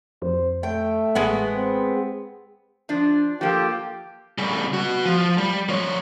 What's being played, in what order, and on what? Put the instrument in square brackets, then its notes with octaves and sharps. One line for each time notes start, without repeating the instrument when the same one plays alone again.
[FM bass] F2 [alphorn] C5
[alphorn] A3 [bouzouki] G5
[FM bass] A1 [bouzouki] G#3 B3 F#5
[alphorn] C4
[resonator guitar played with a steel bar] F3 D4
[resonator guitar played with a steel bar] F3 A#3 A4 [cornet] G4
[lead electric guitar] C#3 G3
B3 F#4
F3
G3
F3 C#5